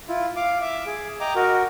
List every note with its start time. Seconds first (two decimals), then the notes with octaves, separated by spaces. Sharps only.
0.08 E4 F4
0.36 F5 D6
0.61 E5 D6
0.86 G#4
1.20 D#5 G5 A#5 D6
1.35 F#4 A#4